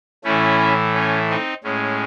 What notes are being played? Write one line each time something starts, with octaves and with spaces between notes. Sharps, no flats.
A2 E3 A3 C#4 E4
C#4
C4 D#4
A2 G#3 C#4